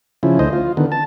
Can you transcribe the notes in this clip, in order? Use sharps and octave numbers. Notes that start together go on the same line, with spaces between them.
C#3 F3 E4
D2 C5 D#5
F4
D3 D#3 B3
A5